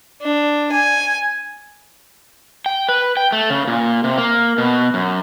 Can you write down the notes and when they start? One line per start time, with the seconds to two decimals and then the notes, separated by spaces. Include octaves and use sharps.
0.22 D4
0.72 G#5
2.66 G5
2.89 B4
3.17 G5
3.32 A3
3.50 C#3
3.68 A#2
4.04 C3
4.18 A#3
4.58 B2
4.94 F#2